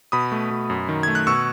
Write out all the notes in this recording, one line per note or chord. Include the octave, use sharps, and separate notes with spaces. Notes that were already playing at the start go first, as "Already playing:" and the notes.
B2 B5 D#6
A3
B2
F#2
D#3
A3 G#6
F#6
B2 C#6 E6